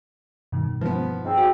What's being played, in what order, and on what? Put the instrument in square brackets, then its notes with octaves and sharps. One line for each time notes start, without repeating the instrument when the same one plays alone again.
[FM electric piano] G2 B2 D#3
[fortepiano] F3 B3
[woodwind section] G#2 C4
[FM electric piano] F#4